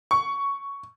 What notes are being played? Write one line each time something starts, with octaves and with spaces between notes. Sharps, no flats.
C#6